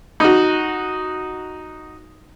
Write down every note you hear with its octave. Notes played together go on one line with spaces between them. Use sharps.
D#4 F#4